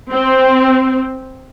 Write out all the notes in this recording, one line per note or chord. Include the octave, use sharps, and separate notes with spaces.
C4